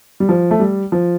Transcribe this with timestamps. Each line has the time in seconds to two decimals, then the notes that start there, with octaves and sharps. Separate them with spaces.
0.20 G3
0.29 F3
0.51 A3
0.60 G3
0.92 F3